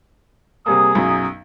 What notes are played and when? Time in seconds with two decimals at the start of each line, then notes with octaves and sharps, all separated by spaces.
0.66 C3 G3 A#3 G#4 D#6
0.95 B1 F#2 F#3